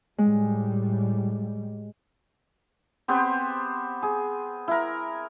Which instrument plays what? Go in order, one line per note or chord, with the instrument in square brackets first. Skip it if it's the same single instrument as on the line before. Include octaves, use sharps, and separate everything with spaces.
[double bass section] A2 G3 [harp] G#3
[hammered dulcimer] B3 C4 G4 C5
G#4
E4 A#4